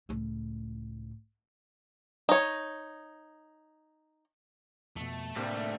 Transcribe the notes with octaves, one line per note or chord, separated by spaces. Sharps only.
C#2 A2
D#4 C#5
F2 B2 A3
D2 A2 C3 G3 A#3